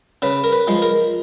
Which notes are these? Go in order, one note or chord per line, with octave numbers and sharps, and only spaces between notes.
C#3 B4
A#4
B4
F3 G#3
A#4